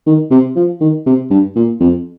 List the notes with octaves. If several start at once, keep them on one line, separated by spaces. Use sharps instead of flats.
D#3
C3
F3
D#3
C3
G2
A#2
F2